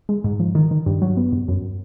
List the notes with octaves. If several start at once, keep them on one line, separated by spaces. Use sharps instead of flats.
G#3
G#2
F3
D#3
D#3
G2
F#3
B3
G2
F#2